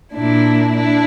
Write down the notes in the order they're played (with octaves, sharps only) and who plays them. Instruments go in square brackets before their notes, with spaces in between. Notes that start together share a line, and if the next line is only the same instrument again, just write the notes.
[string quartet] A#2 D4 E4
D4 E4